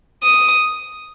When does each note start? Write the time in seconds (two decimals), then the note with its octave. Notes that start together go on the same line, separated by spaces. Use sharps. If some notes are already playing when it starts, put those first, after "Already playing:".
0.24 D#6